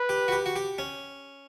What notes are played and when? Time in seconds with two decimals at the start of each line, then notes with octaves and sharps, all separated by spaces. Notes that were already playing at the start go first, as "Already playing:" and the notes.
Already playing: B4
0.09 G4
0.28 F#4
0.32 G4
0.46 F#4
0.56 G4
0.78 C#4